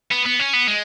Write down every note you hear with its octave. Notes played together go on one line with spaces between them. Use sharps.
B3
B3
C#4
B3
G#3